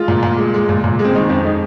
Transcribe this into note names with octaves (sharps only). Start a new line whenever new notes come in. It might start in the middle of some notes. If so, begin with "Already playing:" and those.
Already playing: G#3 F4
A#2
A#2
G#3
G#3
A#2
A#2
G#3
C4
D#3 D#4
F2 C4
G#3 D#4